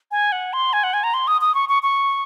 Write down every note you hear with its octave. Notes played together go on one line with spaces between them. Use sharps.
G#5
F#5
C6
G#5
F#5
G#5
A#5
C6
D#6
D#6
C#6
C#6
C#6